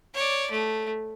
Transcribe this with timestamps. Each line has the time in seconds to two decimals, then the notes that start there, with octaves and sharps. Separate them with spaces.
0.14 C#5 D5
0.51 A3